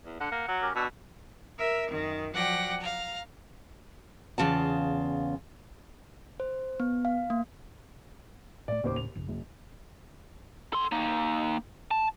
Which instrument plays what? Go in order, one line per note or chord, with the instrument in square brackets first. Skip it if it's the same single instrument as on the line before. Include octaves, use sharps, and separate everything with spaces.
[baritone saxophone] E2
[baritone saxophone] D3 [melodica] F#5
[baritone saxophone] A#3
F#3
[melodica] C#4 G4 A#4
[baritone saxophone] B2 [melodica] D4 C#6 E6
[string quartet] A#4 E5
F#2 D#3
F3 F#3 D5 F#5 G5 A#6
F5 A#5
[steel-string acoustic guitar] E2 C#3 F4 A5
[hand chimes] C5
B3
F5
A#3
[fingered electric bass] A2 A3 [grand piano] D5
[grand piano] D#2 C5 D6 [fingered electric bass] A2 C#3 C#4
[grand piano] F7
[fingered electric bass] A#1 F#2 C#3
[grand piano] F#1
[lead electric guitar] A4 C6
A#3 D#4
A5